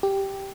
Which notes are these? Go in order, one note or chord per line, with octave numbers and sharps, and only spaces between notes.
G4